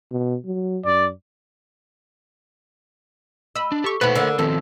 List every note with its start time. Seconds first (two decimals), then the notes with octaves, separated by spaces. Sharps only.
0.11 B2
0.45 F#3
0.85 F#2 D5
3.56 D#5 B5 E6
3.72 D4
3.84 G4 A4 C#6
4.01 D#2 B2 A4 B4 C5 F#5 B5
4.15 D3 A#3
4.39 D#3 F3 C4 A4